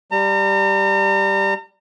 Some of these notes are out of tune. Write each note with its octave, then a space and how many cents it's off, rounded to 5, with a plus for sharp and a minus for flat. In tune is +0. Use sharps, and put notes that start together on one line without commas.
G3 +0 A#5 -40